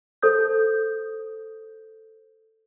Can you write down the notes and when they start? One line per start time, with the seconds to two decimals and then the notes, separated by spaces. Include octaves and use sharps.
0.23 A4 C5 D#6 G6